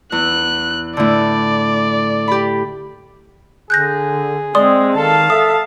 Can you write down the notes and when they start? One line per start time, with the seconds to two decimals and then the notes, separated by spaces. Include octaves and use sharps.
0.12 E2 F#6
0.97 A2 D3 D5
2.28 G4 B5
3.70 D3 G#4 F#6 G6 A#6
4.55 G#3 C4 D5 C6 D#6
4.96 D#3 A4 F5 A5
5.30 A4 E5 D#6